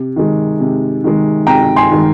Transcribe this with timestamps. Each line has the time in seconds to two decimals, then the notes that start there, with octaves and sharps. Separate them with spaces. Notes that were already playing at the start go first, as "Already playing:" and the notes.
Already playing: C3
0.16 D#3 G#3
0.60 C3
1.04 D#3 G#3
1.47 C3 G5 A#5
1.76 G#5 C6
1.92 D#3 G#3